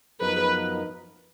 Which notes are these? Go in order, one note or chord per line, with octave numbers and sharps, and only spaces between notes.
F#2 F3 B3 D#4 A#4 B4